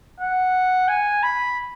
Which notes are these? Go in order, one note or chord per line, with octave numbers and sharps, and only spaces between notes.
F#5
G#5
B5